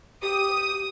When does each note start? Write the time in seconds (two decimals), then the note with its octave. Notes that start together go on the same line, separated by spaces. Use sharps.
0.22 G4 D#6